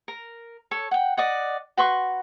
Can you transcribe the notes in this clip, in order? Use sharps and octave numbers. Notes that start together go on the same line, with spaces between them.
A#4
A4 C#5
F#5 G5
D5 D#5 F#5
F#4 B4 C6 C#6